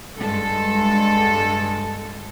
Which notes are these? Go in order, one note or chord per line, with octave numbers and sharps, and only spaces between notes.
G2 G#3 A4